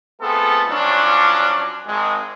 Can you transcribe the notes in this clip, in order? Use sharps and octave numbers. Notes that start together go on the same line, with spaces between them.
A3 B3 C4 F4 G#4 A4
F3 F#3 C#4 D4
G#1 G#3